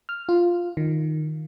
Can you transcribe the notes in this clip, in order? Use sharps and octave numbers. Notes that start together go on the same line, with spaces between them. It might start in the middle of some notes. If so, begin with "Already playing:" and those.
F6
F4
D#3